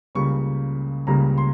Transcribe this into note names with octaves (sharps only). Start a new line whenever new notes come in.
C#2 C#3 G3 A#3 C#6
C#2 C#3 G3 A#3 A#5
C6